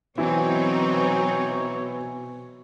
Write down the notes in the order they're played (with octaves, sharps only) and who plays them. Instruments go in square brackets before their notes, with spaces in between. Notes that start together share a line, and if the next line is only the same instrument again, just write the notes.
[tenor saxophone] B2 [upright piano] E3 E4 [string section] F#3 C4 D#4 [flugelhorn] C#5